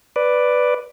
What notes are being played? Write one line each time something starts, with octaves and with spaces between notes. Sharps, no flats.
B4 D5